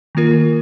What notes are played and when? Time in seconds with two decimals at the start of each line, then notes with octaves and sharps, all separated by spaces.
0.15 D#3 A#3 F4 A#4